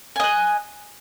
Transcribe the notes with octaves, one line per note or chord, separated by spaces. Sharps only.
D#5 G#5 F#6